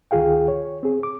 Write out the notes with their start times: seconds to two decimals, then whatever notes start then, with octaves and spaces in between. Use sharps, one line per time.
0.11 D2 D#3 F4 G#4 F5 G5
0.48 C#5
0.83 C4 G#4
1.03 D6